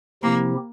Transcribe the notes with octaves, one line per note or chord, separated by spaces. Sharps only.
C3 F3 A#3 C4 E4 G4